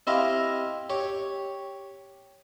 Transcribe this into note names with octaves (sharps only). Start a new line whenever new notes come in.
C4 E4 G4 D#5 F5
G4 C#5